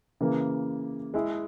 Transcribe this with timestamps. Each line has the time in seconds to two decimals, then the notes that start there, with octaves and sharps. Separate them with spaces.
0.20 C#3 E3 A#3
1.14 G#3 E4 G#4